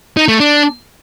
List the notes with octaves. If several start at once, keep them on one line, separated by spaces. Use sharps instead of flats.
D#4
A3
D4